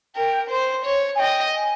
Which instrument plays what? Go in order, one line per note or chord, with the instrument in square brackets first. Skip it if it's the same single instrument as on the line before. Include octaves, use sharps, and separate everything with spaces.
[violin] A#4 [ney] G5
[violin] C5
C#5
[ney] G#5
[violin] D#5 [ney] G5
[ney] G#5